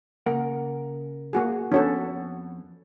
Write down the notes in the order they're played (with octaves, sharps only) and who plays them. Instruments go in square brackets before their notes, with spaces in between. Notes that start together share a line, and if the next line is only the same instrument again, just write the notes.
[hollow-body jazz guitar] C#3 A#4 F#5 [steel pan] A#3
[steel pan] A#3 F#4 G#4
[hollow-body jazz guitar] F2 B3 [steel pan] C#4 F#4 A4 [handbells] D4 C#5